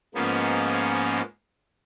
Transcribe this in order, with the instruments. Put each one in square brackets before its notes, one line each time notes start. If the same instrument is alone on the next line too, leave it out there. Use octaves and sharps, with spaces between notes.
[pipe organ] G#2 F3 G#3 A#3 B3 C#4